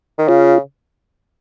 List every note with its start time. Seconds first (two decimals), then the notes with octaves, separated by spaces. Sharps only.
0.18 D#3
0.28 C#3 F4